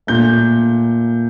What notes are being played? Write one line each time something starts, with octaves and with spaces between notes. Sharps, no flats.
A#2 A3 G6